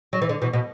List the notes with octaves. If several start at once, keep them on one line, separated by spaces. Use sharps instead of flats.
F#3
E3
D3
B2 E3
B2